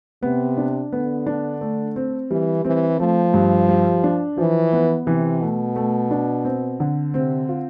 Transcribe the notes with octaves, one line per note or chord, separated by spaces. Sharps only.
C3 B3
D4
D3 B3
D4
A3
C4
E3 G3
E3 C4
F3 A3
G2
G3
D4
E3 F3
B3
C3 E3
B2 A3
A3
D4
C4
D3
C3 C4
F4